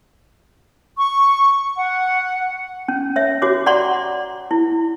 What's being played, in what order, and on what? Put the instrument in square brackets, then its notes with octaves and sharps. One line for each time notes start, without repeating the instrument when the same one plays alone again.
[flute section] C#6
F#5
[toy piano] C#4
C#5 E5
F#4 C#5 D6
D5 F#5 A#5 C6 C#6
E4